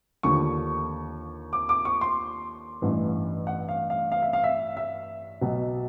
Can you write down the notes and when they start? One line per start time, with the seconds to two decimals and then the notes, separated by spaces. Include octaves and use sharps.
0.23 D#2 D3 F3 C#6
1.53 D6
1.69 D6
1.85 C#6
2.01 C6
2.82 A1 G2 E3
3.47 F#5
3.69 F5
3.90 F5
4.12 F5
4.22 E5
4.33 F5
4.44 E5
4.77 E5
5.41 B1 B2 F#3